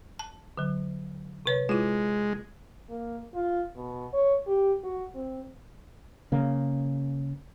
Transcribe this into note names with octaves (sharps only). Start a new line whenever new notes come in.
A5
D3 F#3
C3 B4 C#5
G#3 E4 F4
A#3
F4
B2
C#5
G4
F#4
C4
C#3 A#3